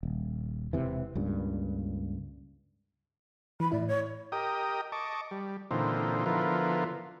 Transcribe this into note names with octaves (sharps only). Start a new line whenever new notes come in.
D#1
E1 C3 E3
C#2 G2 A#2
E3 B5
A2 E4 D5
C#5
G4 A#4 D#5 G5 D#6
D#5 A5 C#6 D6
G3
A#2 D3 E3 C4 D#4 F4
D3 F3 B3 E4 F4 A#4